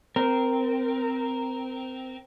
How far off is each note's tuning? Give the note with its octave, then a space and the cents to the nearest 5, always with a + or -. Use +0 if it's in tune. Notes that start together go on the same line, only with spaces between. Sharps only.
C4 -15 A#4 +0